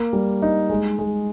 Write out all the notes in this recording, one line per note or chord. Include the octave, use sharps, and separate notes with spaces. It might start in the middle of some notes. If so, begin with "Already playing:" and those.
Already playing: A#3
G3
D#4
G#3
G#3